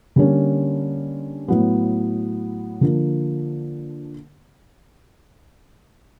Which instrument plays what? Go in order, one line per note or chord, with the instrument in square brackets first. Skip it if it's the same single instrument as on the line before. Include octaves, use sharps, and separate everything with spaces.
[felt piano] D3 G3 A#3 C#4
A2 F#3 B3
D3 F3 A#3